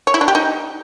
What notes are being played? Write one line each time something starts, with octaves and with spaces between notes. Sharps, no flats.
C#5
E4
D4
G4
D#4